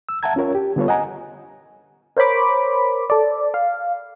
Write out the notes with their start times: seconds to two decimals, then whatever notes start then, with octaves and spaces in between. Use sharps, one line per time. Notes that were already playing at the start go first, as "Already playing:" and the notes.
0.09 E6
0.23 E5 F#5 A5 A#5 G#6
0.36 C#4 F4 A#4 C#5
0.55 G4
0.76 D3 G3 B3 F4 A4 C#5
0.88 D#5 F#5 G#5 A#5
2.17 A#4 C5 C#5 B5 D6
3.10 A4 D5
3.54 F5